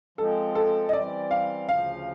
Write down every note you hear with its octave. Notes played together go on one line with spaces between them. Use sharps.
F3 G#3 C4 A4
A4
D#5
E3 G3 C4 D5
F5
D2 C#3 F3 F5